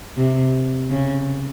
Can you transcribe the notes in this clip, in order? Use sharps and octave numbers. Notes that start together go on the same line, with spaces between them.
C3
C#3